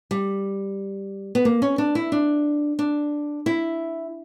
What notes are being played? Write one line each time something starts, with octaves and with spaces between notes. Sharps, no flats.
G3
B3
A#3
C#4
D4
E4
D4
D4
E4